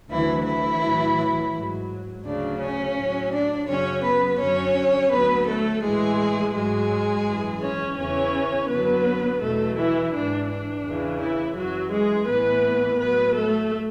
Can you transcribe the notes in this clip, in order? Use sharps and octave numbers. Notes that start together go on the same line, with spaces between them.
D2 D3 E3 F#3 E4
E3 E4
A2 F#3
G#2 F#3
D2 C#3 F#3 D4
C#4
A2 F#3
D4
F#2 C#3 F#3 C#4 C#5
B3 B4
F#2 D3 F#3 C#4 C#5
D2 D3 F#3 B3 B4
A3 A4
A2 E3 G#3 G#4
G#2 F#3 G#3 G#4
F#2 E3
C#4 C#5
E2 C#3 E3 C#4 C#5
F#2 D3 F#3 B3 B4
E2 B2 F#3 A3 A4
E3 E4
G#2 E3 D4
D4
E2 C#3 E3
E3 E4
F#2 E3 F#3 F#4
G#3 G#4
A2 E3 B3 B4
A2 F#3 B3 B4
A3 A4